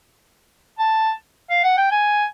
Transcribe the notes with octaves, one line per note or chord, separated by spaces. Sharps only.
A5
F5
F#5
G5
G#5